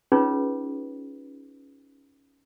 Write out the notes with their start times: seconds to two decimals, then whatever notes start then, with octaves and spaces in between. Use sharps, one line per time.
0.12 C#4 D#4 F4 G#4 B4 C#5